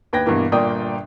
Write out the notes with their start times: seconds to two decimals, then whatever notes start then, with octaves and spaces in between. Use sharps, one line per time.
0.13 D#2 B4 G5 G#6 A#6
0.26 G2 B2 E3 A#3
0.52 G1 A#2 A#3 D5 G5 D#6